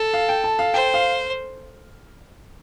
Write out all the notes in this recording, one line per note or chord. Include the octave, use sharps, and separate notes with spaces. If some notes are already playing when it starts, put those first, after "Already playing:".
Already playing: A4
F5
G5
A5
F5
C5 G5
F5